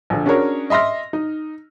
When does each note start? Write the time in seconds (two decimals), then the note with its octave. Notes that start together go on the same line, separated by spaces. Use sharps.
0.10 A#1 D3
0.26 C#4 D4 F#4 G#4 A#4 C#5
0.70 D#5 E5 C6 F6 A#6
1.13 D#4